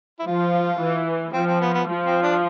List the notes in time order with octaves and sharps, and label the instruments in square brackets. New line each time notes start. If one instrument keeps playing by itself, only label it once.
[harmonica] E4
[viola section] F3 [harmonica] F4
[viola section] E3
[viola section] F3 [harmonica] C4
[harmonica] C4
B3
B3
[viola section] F3
[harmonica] C4
D4